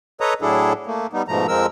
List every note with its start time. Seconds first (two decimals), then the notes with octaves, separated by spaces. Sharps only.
0.21 A4 B4 C#5 D#5 A#5 D#6
0.42 A2 F#3 D4 E4 G#4 A4
0.87 A3 A#3
1.13 G3 B3 D#4
1.28 G#2 B2 F3 A3 A#5
1.48 F2 F3 G#3 C4 A#4 E6